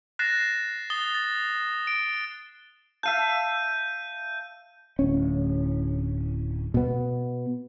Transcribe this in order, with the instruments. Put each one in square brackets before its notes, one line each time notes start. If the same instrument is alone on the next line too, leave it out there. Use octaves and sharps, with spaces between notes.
[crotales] F#6 A6 A#6 C7 E7
D#6 A6 G7
A6
D7
[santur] E5 F5 A5 [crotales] G6 D#7
[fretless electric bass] D1 C#4
B2 B3